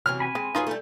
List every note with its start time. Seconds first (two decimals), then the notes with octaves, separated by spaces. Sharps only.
0.06 C3 E3 F#3 F6
0.20 G#5 B5
0.35 G#3 C4
0.55 F#2 F#3 D#4 F4 G#4 B4
0.67 G3 A3